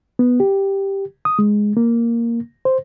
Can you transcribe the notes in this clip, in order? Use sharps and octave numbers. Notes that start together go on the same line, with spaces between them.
B3
G4
D#6
G#3
A#3
C5